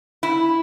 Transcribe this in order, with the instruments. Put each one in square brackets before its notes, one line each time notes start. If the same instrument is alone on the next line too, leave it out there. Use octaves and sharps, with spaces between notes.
[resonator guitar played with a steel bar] E4